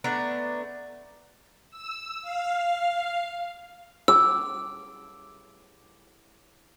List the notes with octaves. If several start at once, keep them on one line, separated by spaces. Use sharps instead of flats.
A3 B3 D4 A#5
E6
F5
D6 E6